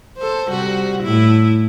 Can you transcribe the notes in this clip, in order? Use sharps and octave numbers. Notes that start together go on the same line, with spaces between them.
A4 C5
C3 G3 F#4
A2 E4